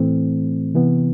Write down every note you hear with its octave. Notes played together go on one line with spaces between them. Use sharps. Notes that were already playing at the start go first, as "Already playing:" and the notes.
Already playing: A2 E3 A3 C4
C3 E3 B3